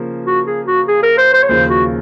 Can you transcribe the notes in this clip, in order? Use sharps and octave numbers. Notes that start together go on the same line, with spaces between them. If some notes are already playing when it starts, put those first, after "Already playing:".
Already playing: C#3 F3 A#3
F#4
G#4
F#4
G#4
A#4
C5
C5
C#5
D#2 C#3 F3 C5
F#4